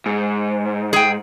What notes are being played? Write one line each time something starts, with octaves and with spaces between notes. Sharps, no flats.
G#2
G#4 G5